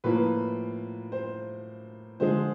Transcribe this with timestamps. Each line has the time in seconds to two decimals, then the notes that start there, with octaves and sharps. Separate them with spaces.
0.04 A2 F3 A#3 B4
1.12 C5
2.20 D3 F3 G#3 C5